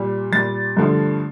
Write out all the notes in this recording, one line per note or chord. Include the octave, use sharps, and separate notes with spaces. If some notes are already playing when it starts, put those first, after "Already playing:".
Already playing: A#2 G3
A#2 G3 A6
G2 D3 F3 A3